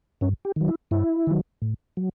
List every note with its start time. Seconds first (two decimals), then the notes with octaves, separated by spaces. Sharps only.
0.21 G2 C#4
0.45 G4
0.56 D#3 F#3
0.68 E4
0.91 G2 E4
1.27 D#3 F#3
1.62 A2
1.97 F#3